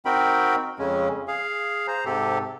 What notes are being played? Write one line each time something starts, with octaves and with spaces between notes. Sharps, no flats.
C4 D#4 F#4 A#4 G5 B5
F2 C#3 G#3 C#4
G#4 F5
C5 A#5
G#2 C3 G4 A4